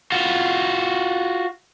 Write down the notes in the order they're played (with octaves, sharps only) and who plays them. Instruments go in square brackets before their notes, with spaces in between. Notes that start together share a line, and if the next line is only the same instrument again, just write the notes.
[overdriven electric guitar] F4 F#4